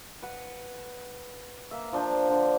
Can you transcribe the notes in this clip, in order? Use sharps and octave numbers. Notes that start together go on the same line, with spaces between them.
B4 F#5
A#3 E5
F3 D4 C5
D3